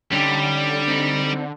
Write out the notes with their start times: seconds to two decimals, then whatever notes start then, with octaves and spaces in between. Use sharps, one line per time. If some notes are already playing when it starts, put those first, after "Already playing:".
0.12 D3 G3 C#4 D#4 G4
0.88 C4 D#4